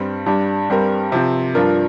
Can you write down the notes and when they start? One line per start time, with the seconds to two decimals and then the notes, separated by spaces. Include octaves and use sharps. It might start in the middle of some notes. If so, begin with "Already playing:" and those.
Already playing: G2 G3 C4
0.26 G2 G3 D4
0.70 G2 G3 C4 G4 A#4
1.12 C3 F3 C4
1.55 G2 F3 D4 F4 A#4